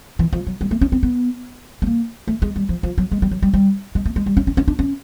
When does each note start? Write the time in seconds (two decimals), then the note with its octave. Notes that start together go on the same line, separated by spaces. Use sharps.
0.19 E3
0.33 F3
0.47 F#3
0.61 G3
0.71 A3
0.81 C#4
0.92 C4
1.03 B3
1.82 A3
1.87 A#3
2.28 A3
2.42 G#3
2.56 G3
2.69 F3
2.83 F3
2.98 F#3
3.11 G#3
3.22 G3
3.31 F#3
3.42 G3
3.53 G3
3.95 G#3
4.06 A3
4.16 G#3
4.26 G3
4.37 C#4
4.47 C#4
4.57 C#4
4.68 D4
4.79 C#4